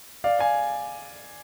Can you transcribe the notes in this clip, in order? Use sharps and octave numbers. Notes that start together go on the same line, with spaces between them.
D5 F5
F5 G#5